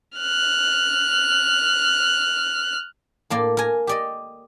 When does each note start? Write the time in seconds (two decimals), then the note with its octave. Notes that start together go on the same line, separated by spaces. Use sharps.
0.18 F6 F#6
3.30 A2 A#3 D5
3.57 A#4 G#5
3.87 G4 D5 D#5